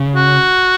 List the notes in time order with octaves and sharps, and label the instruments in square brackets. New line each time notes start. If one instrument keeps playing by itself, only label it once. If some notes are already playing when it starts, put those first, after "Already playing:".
Already playing: [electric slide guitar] C#3
[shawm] F#4